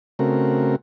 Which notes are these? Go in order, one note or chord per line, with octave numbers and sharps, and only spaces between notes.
C#3 A3 C4 F#4 A#4